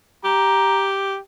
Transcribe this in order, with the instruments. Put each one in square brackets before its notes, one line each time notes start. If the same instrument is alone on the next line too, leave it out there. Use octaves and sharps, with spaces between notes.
[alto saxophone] G4 [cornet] A#5